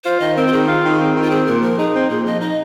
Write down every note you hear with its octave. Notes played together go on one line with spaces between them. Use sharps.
F4 C5
D#3 D#5
C4 A#4
F4
D#3 G#4
F4
D#3
C4
D#3
F4
C4 G#4
A#2 A#4
F3 A#4
D#4 G#4
C4
A#2 G#4
F3 D#5
D#4 D#5